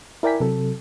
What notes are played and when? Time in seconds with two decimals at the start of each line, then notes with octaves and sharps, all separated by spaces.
0.23 E4 A#4 D5 G5 G#5 B6
0.40 C3 F#3 A4